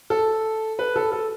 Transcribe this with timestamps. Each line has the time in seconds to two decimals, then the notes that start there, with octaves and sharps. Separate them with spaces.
0.10 A4
0.79 B4
0.96 A4
1.12 A4